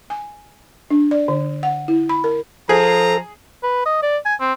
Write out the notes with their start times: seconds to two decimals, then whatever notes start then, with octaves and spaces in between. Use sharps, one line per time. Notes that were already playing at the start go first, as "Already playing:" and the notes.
0.10 G#5
0.90 D4
1.11 D5
1.28 D3
1.63 F#5
1.88 E4
2.09 B5
2.24 A#4
2.69 F3 G#4 A4 A#5
3.63 B4
3.86 D#5
4.02 D5
4.25 G#5
4.40 C4